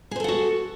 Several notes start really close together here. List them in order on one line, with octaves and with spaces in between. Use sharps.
G#4 C5 A4 F#5 F#4